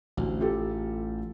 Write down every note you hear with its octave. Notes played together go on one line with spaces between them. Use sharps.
A1 D2
F4 G4 A4